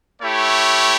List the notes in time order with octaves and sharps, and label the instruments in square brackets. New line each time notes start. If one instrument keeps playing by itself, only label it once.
[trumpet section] A3 E4 G4 C#5